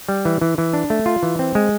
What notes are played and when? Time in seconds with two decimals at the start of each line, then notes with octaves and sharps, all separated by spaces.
0.09 G3
0.25 E3
0.41 E3
0.58 E3
0.73 D4
0.90 A3
1.06 F4
1.23 E3
1.39 C4
1.55 G#3